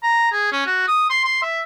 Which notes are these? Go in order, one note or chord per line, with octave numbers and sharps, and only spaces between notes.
A#5
G#4
C#4
F#4
D#6
C6
C6
E5